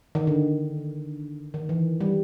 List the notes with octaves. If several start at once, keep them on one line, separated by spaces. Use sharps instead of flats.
D#3
D3
D#3
E3
G3